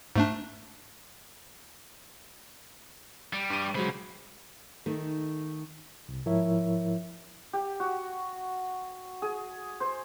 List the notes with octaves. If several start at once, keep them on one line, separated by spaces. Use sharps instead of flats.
G#2 A3 D4
G3
G2 D#7
C#3 F#3 G#3 C5 B5
D#3 A3 D#4
C2
G#2 F3 E4 A#4 C#5 E5
G4
F#4
G#4
C5